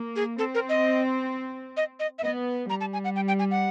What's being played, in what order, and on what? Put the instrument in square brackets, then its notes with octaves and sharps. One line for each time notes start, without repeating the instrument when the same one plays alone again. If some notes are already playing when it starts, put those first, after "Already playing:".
Already playing: [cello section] A#3
[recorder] G#4
[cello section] C4 [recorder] A4
[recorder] A#4
D#5
D#5
D#5
E5
[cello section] B3 [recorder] D#5
[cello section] G3 [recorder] A#5
[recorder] A5
G#5
F#5
G5
G5
G#5
F#5